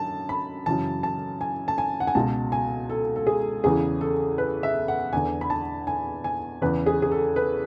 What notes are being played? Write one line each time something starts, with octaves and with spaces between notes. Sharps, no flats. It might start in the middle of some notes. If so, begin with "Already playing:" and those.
Already playing: F#2 D3 A5
B5
F#2 C#3 E3 A5
A5
G#5
A5
G#5
F#5
G#5
C#2 B2 A5
G#5
A4
A4
G#4
E2 C#3 E3 G#4
A4
B4
E5
F#5
E2 D3 G#5
B5
A5
G#5
G#5
E2 C#3 E3 B4
G#4
G#4
A4
B4